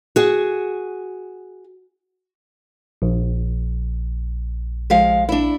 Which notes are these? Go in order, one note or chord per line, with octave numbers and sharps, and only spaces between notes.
F#4 G#4
A#1
F3 G#3 F5
D4 E4